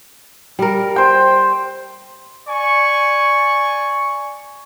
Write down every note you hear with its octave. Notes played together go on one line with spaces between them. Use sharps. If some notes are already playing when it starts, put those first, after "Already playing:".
G3 A#4
C5 G5
D5 G#5 C#6